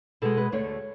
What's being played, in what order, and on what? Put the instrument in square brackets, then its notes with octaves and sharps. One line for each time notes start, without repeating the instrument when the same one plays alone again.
[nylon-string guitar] B2 G#3 A4
B4
D2 D3 A3 C#5